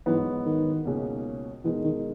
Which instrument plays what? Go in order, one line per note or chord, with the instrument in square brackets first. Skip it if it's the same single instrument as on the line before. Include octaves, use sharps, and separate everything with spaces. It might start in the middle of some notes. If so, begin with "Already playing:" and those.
[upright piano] G#2 F#3 B3 D#4 [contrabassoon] E3
[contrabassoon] D#3
[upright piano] C#2 B2 A#3 C#4 G#4
[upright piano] B2 G#3 D#4 A#4 [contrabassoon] E3
[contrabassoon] D#3